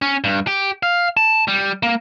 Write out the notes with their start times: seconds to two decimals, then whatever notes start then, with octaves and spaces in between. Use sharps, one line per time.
0.02 C#4
0.24 G2
0.47 G4
0.83 F5
1.17 A5
1.48 G3
1.83 A#3